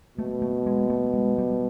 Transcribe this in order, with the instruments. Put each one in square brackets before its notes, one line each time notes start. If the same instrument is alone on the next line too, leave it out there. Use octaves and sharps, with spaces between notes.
[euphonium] B2 [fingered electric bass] A3
[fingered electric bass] A3
G#3
A3
G#3
G3